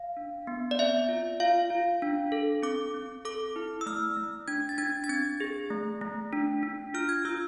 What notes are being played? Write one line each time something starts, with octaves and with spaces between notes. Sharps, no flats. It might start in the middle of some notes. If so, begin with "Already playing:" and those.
Already playing: F5
D4
B3
D5
C4 E5
F4
F4 F5
F4
D4
A4
C4 D6
C4
A4 D6
E4
E6
A3 F6
A3
D4 G#6
A6
D4 G#6
A6
C4 G#6
G#4
A3
A3
D4
D4
F4 F6
G#6
F4 E6